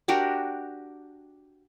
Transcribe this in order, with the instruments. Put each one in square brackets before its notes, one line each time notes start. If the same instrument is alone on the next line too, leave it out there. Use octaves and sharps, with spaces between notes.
[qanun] D4 F#4 G4 A#4